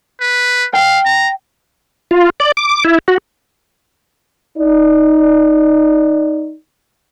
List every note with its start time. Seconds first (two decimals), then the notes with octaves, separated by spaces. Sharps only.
0.20 B4
0.74 F5 G5
1.05 A#5
2.11 F4
2.40 D5
2.57 D6
2.84 E4
3.08 F#4
4.57 D#4 D5